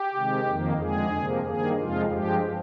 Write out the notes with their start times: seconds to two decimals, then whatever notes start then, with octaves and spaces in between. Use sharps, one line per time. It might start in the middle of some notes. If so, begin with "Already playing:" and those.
Already playing: G4
0.14 C3 D#3 G#3
0.46 F2 D#3 A#3
0.79 F2 D3 G#3 G#4
1.13 F2 C3 F3 A#3
1.46 G2 D#3 A#3 G#4
1.78 F2 C3 F3 G#3 F4
2.11 G2 F3 G#3 G4